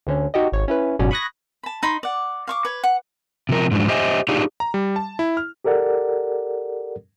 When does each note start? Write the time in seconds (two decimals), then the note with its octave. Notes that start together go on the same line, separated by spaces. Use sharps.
0.07 D2 D3 C#4
0.34 D#4 F#4 G4 D#5
0.52 G#1 C#5
0.68 C#4 E4 B4
0.99 G1 G#2 B2 F#3 C#4 D5
1.11 B5 C#6 D#6 F#6 G#6 A#6
1.63 A5 B5
1.83 D#4 B5 C6
2.03 D5 F#5
2.47 F5 C#6 D6
2.65 B4 C#5
2.83 F#5
3.49 C3 F3 A#4
3.71 G#2 F3 F#3 G#3 D4
3.88 G4 C5 D#5 E5 G#5
4.29 D4 D#4 F4 G4 G#4
4.60 A#5
4.74 G3
4.96 A5
5.19 E4
5.37 F6
5.65 G4 A4 A#4 D5 F#5